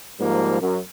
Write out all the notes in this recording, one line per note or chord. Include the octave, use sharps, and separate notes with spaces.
G#2 F3 G3 A#3
F#2